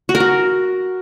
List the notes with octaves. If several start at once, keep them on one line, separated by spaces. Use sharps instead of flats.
F#4
A#4
F#4